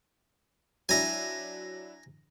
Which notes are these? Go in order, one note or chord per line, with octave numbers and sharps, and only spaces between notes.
F#3 D4 E4 G#5 A#5